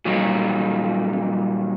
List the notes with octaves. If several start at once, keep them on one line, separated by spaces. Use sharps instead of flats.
A#2 D#3 F#3 G3